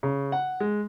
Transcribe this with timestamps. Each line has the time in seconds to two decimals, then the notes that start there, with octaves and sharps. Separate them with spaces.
0.03 C#3
0.32 F#5
0.60 G#3